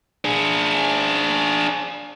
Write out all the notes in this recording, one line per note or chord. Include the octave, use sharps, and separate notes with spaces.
D4 G#4